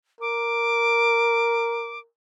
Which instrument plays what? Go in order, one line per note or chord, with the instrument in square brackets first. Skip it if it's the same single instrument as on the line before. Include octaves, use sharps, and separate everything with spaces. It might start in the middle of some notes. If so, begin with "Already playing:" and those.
[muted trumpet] A#4 [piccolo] D6